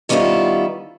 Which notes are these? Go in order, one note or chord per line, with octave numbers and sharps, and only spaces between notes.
D#3 G3 B3 C#4 E4 F4